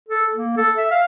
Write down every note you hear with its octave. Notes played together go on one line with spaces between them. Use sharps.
A4
A#3
A4
E5
F5